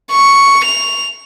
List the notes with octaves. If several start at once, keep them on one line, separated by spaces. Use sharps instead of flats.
C#6
F7